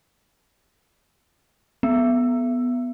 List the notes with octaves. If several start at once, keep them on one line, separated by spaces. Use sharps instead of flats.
B3